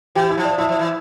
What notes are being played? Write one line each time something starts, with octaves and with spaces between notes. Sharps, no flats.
E3 G4 G5
E4 E5
F3
D5
F3 E4 E5
F3
E3